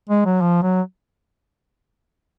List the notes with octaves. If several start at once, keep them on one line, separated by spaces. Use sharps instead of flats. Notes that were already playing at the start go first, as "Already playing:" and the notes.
G#3
F#3
F3
F#3